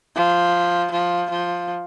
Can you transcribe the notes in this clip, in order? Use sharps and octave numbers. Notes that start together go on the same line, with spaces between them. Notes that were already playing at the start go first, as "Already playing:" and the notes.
F3
F3
F3